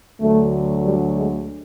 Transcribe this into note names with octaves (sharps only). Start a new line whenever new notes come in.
D2 D3 F#3 A3
G3
G#3